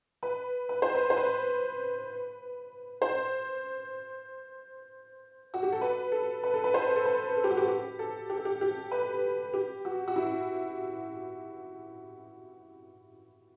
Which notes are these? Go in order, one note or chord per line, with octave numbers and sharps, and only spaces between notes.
B4
B4
C5
B4
C5
B4
C5
F#4
G4
A4
B4
A4
B4
A4
B4
C5
A4
B4
A4
G4
F#4
G4
G4
A4
G4
A4
G4
G4
B4
G4
F#4
F#4
E4